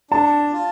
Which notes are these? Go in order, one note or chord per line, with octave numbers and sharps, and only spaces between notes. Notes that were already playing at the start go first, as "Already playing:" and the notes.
D4 A5
F4